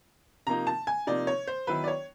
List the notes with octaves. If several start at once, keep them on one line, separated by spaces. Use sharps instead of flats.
C3 F3 A#3 D#4 A#5
A5
G#5
C3 F3 A#3 D#4 D5
C#5
C5
D#3 F#3 B3 E4 B4
D5
C#5